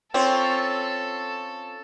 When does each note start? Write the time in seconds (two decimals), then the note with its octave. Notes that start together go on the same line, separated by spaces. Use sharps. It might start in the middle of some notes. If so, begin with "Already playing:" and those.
0.14 C4 C#4 F4 A4 C#5